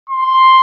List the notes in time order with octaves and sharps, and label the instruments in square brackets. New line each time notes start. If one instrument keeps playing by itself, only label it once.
[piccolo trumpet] C6